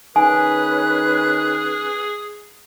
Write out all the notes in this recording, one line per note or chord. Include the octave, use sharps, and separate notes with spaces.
D#3 C#4 G#4 B4 G#5 F#6